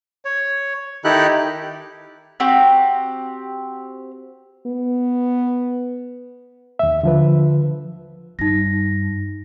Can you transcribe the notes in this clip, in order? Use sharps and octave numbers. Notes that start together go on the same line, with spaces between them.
C#5
D#3 D#4 E4 G4 A4 F#6
C4 F#4 G4
B3
D#2 E5
D3 F3 B4
G2 D#4 A#6